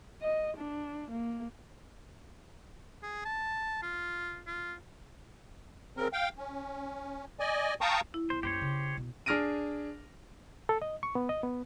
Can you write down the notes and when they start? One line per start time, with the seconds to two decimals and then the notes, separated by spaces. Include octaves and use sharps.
0.21 D#5
0.57 D4
1.11 A#3
3.03 G#4
3.25 A5
3.82 F4
4.47 F4
5.97 C#3 C4 A#4
6.13 F5 G5
6.38 C#4
7.40 D5 D#5 G#5
7.81 F5 G5 A5 A#5 C#6 D#6
8.14 E4
8.30 B1 C5
8.43 F#2 A#3 G4 C5 C#5
8.61 C#3
8.97 B2
9.26 D4 G#4 F6 A#6 D7 D#7
10.69 A4
10.82 D#5
11.03 C#6
11.15 B3
11.29 D#5
11.43 B3